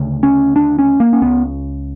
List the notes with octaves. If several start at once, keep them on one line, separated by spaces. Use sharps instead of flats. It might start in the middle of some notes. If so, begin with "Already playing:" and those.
Already playing: D2 C#3
C#4
D4
C#4
A#3
C#4
C#2 C#3 B3